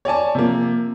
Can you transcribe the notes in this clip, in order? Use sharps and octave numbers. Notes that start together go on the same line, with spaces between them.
C#5 D5 G#5 A5
C3 F3 A#3